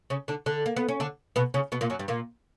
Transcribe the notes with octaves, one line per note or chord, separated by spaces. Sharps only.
C#3 C#4
D3 D4
D3 D4
A#3
B3
C#4
D3 D4
B2 B3
C#3 C#4
B2 B3
A#2 A#3
F#2 F#3
G2 G3
A#2 A#3